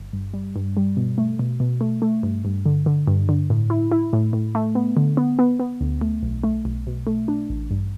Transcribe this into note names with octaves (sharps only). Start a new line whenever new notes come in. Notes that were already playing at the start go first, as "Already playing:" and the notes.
Already playing: G1
G2
G3
G2
G3
B2
A3
B2
B2
A3
A3
G2
G2
D3
D3
G2
D3
A2
E4
E4
A2
A2
A3
B3
D3
B3
B3
B3
D2
A3
B1
A3
B1
B2
A3
D4
A1
G2